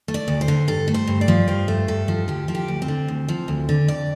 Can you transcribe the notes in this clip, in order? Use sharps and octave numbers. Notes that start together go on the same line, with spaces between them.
A3
D5
D2
C5
D3
G2 A4
A3
C5
G2
D5
F3
G2 C5
A3
G2 A4
F3
D2 G4
F3
G4
D2
C4
D3
D2
F3
D2
D3
F2 D5